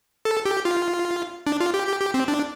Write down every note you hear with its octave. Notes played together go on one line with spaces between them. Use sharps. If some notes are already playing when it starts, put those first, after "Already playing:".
A4
G4
F4
D4
F4
G4
G4
G4
C4
D4